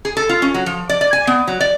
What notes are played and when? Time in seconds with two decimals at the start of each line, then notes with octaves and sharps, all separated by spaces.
0.05 G#4
0.17 A4
0.29 F4
0.42 C#4
0.54 F#3
0.66 F3
0.89 D5
1.01 D5
1.13 G#5
1.27 B3
1.48 F#3
1.60 D5